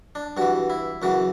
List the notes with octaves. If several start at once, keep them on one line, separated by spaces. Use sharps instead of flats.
D4
G2 E3 F#4
E4
F#2 C#3 E3 F#4